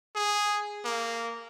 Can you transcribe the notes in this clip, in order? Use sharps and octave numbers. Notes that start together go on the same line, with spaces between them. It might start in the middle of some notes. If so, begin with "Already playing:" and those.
G#4
A#3